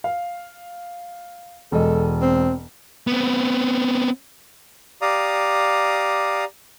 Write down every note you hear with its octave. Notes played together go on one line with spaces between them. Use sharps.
F5
E1 G#3 A4 D#5
C4
B3 C4
G4 D5 F5 A#5 D#6